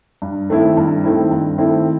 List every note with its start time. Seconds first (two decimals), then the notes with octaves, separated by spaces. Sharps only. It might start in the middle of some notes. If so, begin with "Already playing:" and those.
0.22 G2
0.50 D#3 A3 C4 E4
0.77 G2
1.04 D#3 A3 C4 E4
1.31 G2
1.58 D#3 A3 C4 E4